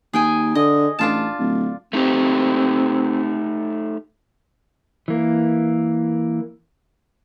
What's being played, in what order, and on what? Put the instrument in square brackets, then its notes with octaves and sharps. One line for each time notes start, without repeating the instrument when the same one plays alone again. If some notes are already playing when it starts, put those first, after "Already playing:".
[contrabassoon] D#2 [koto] G#4 G5 G#5
[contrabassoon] D3 [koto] D#5
[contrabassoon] A1 [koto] D4 F4 A5
[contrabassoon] D1
[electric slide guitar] A3 D#4 G4 [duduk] C4
[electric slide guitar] E3 A#3